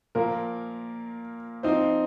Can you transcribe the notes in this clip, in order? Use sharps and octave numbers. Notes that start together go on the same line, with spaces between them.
A#2 F3 A#3 A#4
F3 C4 D#4 C5